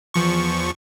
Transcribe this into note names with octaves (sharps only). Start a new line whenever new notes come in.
E2 F3 C#6